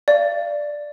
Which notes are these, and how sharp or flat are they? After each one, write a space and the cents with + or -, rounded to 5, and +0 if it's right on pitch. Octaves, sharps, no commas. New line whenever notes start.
D5 +0 F5 -35